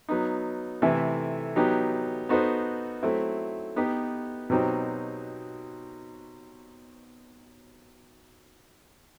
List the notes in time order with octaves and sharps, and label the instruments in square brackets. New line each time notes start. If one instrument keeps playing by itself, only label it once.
[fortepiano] F#3 B3 D#4
C3 E3 A3 E4 A4
F#3 B3 D#4 G4
B3 D#4 F#4 A4 C5
F#3 A3 C4 E4
B3 D#4 G4 B4
B2 F#3 C4 D#4 G4